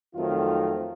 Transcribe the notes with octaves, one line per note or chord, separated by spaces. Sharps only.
F2 D#3 F#3 A3 C4 F4